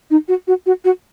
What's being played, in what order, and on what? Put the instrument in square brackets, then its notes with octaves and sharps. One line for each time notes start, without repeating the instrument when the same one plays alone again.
[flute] D#4
F#4
F#4
F#4
F#4